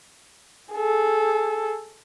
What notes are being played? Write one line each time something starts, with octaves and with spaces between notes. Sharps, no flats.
G#4 A4